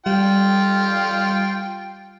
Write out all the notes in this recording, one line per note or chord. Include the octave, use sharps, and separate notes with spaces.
G3 F4 G5